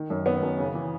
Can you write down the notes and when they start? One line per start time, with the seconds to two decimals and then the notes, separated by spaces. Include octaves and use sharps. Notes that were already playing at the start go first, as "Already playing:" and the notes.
Already playing: D#3
0.10 F#2
0.26 D#3 B3
0.42 F#2
0.58 C#3
0.74 E3